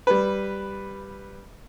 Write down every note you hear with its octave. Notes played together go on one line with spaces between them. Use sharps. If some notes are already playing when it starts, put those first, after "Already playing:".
G3 B4